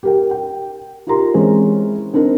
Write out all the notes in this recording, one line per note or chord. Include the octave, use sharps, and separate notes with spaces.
G4 A#4 G5
G5
D#4 F4 G4 A#4 A#5 C6
E3 G#3 C4 C#4
C4 D4 D#4 A#4 C5